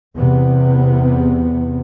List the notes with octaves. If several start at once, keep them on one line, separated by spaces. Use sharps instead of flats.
E2 C3 B3